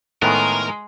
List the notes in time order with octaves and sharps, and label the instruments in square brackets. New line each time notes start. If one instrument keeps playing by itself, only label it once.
[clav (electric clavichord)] A2 D#3 B3 [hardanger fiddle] G#3 [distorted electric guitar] A#4